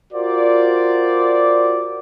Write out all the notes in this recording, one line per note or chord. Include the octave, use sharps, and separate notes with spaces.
F4 F#4 A#4 C5 D5